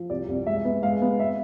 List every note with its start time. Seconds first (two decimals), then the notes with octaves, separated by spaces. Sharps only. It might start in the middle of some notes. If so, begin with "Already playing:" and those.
Already playing: F3
0.10 C2 D5
0.28 C2
0.47 G#3 E5
0.65 B3
0.83 G#3 F5
1.02 B3
1.20 E5